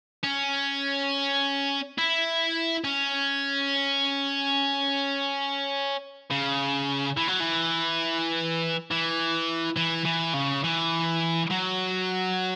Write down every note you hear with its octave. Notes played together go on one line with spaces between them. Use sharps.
C#4
E4
C#4
C#3
E3
F#3
E3
E3
E3
E3
C#3
E3
F#3